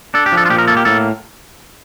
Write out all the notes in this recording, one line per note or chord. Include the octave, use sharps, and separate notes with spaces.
D4 A4
G4
F3
A4
F4
A#2 G4
A#4
A#3 A4
G4
A2 A4